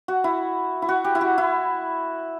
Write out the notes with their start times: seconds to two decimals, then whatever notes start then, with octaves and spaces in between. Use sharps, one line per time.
0.08 F#4
0.24 E4
0.82 E4
0.89 F#4
1.04 G4
1.15 E4
1.21 F#4
1.38 E4